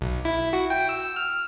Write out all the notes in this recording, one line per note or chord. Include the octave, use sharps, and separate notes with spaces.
B1
E4
F#4
G5
E6
F6